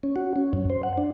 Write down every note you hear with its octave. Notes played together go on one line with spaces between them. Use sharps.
C#4
F#4
C#4
F#2
C5
F#5
D4